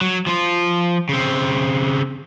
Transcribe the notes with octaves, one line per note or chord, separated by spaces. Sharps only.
F#3
F3 F4
C#3 C4